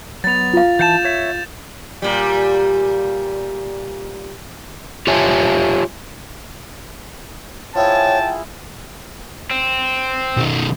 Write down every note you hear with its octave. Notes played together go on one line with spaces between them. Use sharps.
F#3 B3 A6 F7
F4 F5
E3 F#5 A5 G6 A6 E7
C#5 E5
A#2 G3
F4 G4 C#5 E5 G#5 A5
F3 E4 G#4 C#5 G5 A5
C4
B1 D#3